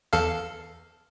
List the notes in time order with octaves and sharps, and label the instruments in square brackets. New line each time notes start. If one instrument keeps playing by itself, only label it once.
[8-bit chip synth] E2 A4 F5